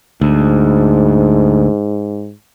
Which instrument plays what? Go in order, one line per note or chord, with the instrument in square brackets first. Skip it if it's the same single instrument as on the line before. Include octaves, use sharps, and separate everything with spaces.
[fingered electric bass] D2 [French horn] G#2